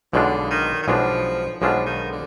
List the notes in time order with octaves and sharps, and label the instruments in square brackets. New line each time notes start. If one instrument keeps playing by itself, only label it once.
[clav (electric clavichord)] B1 B2 G#3 D4 F4 [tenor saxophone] D3
[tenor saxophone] D#3
D#3
[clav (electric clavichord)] B1 B2 G#3 D4 F4 [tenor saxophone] F3
[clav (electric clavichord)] B1 B2 G#3 D4 F4 [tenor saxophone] F3
[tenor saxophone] D#3
D3